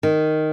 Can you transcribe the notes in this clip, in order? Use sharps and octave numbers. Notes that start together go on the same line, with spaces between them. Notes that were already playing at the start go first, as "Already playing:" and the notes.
D#3